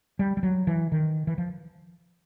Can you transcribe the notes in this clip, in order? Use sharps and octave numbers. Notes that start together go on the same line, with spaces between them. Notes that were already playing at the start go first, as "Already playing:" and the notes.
G3
G3
F#3
E3
D#3
E3
F3